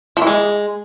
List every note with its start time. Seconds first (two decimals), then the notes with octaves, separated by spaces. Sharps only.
0.17 F3
0.22 E3
0.27 G#3